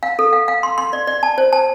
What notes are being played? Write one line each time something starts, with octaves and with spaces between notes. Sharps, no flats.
F5
A4
F5
F5
C6
C6
D5
D5
A5
C5
A5